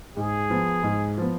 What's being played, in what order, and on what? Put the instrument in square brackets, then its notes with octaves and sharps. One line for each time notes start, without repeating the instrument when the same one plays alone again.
[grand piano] G#2 [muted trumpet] G#4
[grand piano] F3 B3
G#2
F3 B3